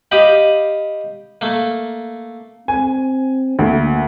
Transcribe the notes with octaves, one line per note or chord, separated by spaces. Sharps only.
G4 D#5 F5 G5 B5
A3 A#3
C4 G#5
D2 A#3